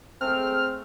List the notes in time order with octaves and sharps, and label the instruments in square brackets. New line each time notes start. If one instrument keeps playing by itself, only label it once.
[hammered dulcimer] G#3 A3 [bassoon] C4 [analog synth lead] F6
[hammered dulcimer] A3